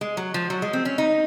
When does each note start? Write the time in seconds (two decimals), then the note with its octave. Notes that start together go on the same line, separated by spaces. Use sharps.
0.01 G#3
0.17 F#3
0.34 F3
0.50 F#3
0.62 G#3
0.73 C4
0.85 C#4
0.98 D#4